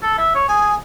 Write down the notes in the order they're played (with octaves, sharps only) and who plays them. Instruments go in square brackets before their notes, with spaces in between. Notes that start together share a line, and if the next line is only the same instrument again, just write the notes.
[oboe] A4
E5
C#5
[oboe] G#4 [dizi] G#5